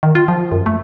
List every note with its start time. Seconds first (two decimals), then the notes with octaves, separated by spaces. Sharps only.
0.03 D#3
0.15 F4
0.28 F3
0.52 F#2
0.66 A3